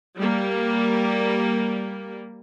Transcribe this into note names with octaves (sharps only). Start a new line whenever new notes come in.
G3 A#3